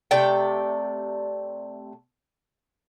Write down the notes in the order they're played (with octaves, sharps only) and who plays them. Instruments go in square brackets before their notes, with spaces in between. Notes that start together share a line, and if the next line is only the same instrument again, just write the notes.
[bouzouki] C3 A3 D5 G5